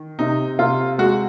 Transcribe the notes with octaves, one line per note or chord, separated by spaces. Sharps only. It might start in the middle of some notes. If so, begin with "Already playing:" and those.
Already playing: D#3
C3 D#4
C3 F4
G#3 F#4